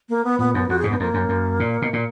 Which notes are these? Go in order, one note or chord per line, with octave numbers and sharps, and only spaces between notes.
A#3
B3
A#2 B3
F#2 B3
F2 F#4
G#2 G#4
F#2 B3
F2 A#3
F#2
F#2
A#2
B2
A#2